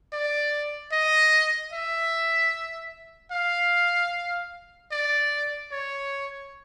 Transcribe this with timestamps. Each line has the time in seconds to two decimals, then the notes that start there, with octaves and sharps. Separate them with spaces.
0.13 D5
0.92 D#5
1.73 E5
3.31 F5
4.92 D5
5.72 C#5